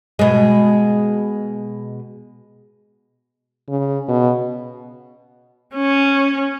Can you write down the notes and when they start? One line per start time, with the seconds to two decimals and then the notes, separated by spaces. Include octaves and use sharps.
0.19 B2 G#3
3.69 C#3
4.09 B2
5.75 C#4